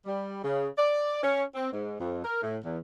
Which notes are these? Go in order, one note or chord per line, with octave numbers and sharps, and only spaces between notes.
G3
C#3
D5
C#4
C4
G#2
F2
A#4
A2
E2